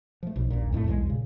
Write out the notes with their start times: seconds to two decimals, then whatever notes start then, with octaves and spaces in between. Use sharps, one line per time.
0.23 F3 A3
0.36 B1
0.50 D#1 A#1 A#2
0.72 F2 A2 G#3 A3
0.86 B1 E2 F#3 G#3
1.06 A#2 C#3